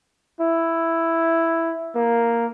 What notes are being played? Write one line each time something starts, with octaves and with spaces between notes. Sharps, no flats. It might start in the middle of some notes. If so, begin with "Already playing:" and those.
E4
A#3